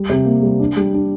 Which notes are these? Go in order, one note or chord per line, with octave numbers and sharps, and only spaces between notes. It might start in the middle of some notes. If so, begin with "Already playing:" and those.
Already playing: G3
C3
A#3
G3
D4
G3
D4